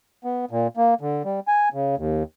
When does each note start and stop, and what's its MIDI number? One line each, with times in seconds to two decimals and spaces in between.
0.24 0.45 59
0.51 0.67 46
0.77 0.94 58
1.01 1.22 50
1.25 1.40 55
1.48 1.69 80
1.74 1.95 49
1.98 2.23 39